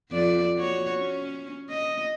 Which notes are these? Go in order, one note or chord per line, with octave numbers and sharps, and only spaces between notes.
F2 D5
A#3 F#4 C#5
C#4
D#5